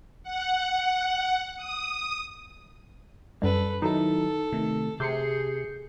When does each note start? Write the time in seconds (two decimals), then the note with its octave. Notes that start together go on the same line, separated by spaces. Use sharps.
0.23 F#5
1.57 D#6
3.42 F#2 G3 A4 B4
3.82 D#3 F#3 D#4 E4 A4
4.53 C3 D#3 A3
5.00 C3 G#4 G6 C7 C#7